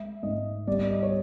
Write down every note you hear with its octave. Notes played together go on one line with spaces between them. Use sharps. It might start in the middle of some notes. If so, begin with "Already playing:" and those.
Already playing: G#3 E5
G#2 D#5
G3 D5
D#5
C#5